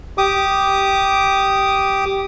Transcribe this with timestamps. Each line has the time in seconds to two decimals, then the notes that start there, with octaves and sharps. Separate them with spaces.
0.18 G4 D6 D#6